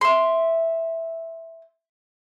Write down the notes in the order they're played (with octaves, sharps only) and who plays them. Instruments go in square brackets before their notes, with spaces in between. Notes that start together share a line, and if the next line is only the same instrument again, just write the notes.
[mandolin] E5 C6